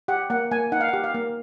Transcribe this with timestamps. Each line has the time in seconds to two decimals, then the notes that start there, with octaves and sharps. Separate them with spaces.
0.08 G4 F#5
0.30 A#3 F#5
0.51 A#3 G#5
0.72 D#4 F#5
0.81 F5
0.89 G4 F#5
1.04 F5
1.14 A#3